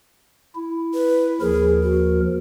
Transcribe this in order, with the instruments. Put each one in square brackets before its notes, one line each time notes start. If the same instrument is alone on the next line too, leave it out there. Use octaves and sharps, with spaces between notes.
[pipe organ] E4
[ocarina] B4
[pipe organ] D#2 F3 A#4 [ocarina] G#4
[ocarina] F#4